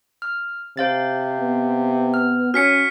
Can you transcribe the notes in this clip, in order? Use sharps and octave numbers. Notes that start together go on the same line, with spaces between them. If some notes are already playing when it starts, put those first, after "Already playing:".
F6
C3 C5 F5 A6
B3
F6
C#4 F#4 G#5 F6 B6 C#7